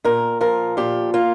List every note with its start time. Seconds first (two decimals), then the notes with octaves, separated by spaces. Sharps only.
0.04 A#2 A#4
0.41 F3 A#4
0.77 A#2 G4
1.14 A#3 F4